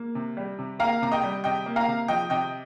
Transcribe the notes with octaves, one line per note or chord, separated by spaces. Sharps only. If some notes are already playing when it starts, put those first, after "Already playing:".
Already playing: A#3
C3
G3
C3
A#3 F5 A#5
C3 A#5
D#5 G5
G3
C3 D#5 G5
A#3
F5 A#5
C3
F3 D#5 G5
C3 D#5 G5